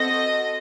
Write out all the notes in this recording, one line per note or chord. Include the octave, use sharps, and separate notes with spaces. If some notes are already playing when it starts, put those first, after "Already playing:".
Already playing: C4 F#4 A4 D#5